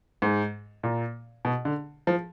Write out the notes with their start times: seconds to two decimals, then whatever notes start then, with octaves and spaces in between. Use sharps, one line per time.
0.22 G#2
0.83 A#2
1.45 B2
1.65 D3
2.07 F3